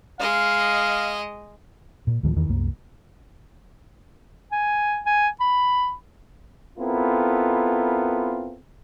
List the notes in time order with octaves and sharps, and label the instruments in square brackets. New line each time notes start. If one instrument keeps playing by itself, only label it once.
[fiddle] G#3 D#5 [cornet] F5
[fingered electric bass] A#2
D2 A2 D#3 F3
E2 D#3 E3
C2 F#2 A#3
[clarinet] G#5
G#5
B5
[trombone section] B3 C4 E4 F4 A4 A#4